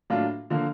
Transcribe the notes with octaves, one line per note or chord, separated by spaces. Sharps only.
A2 F#3 A#3 D4 F4
D3 F3 A#3